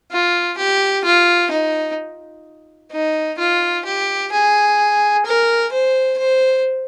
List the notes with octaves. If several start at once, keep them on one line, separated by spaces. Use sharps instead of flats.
F4
G4
F4
D#4
D#4
F4
G4
G#4
A#4
C5
C5